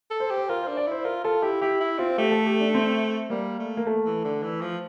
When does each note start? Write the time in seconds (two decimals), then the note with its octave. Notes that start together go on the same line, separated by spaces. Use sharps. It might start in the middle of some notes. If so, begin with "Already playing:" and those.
0.11 A4
0.20 C5
0.31 G4
0.37 C5
0.49 F4 A#4
0.63 D4 C5
0.77 D5
0.87 E4 C5
1.05 F4 A#4
1.24 F4 A4
1.42 E4 G4
1.61 E4 G4
1.80 E4
1.99 C4 F4
2.18 A3 G4
2.31 A4
2.46 G4
2.60 D4
2.74 C4
3.30 G3 A#3
3.59 A3
3.77 A#3
3.87 A3
4.06 E3
4.24 D3
4.43 E3
4.61 F3